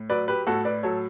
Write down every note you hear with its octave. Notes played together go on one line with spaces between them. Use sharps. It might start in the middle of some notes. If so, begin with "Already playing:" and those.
Already playing: A2
F#3 B4 D5
G4 B4
A2 F#4 A4
B4 D5
F#3 A4 C#5